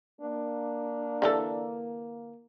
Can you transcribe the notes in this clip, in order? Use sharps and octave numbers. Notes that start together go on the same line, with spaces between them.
A#3 D4
D3 E3 A4